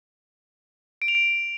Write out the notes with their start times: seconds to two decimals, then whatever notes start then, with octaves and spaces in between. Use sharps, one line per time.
1.02 D7
1.08 F7
1.15 D7